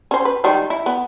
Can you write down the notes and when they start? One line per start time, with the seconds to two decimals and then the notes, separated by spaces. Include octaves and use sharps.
0.11 C#4 C5
0.25 B4
0.44 D#3 G3 G#3
0.70 E4
0.86 B3